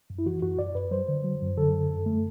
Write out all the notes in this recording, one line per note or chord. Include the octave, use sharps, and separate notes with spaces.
F#2
E4
E3 F#4
F#2 F#4
F#2 D5
F#2 B4
F#3 C5
D3
F#3
F#2
D3 A4
F#2
F#2
A3